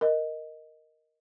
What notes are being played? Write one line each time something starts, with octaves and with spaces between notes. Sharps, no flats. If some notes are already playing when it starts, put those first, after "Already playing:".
A#4 D#5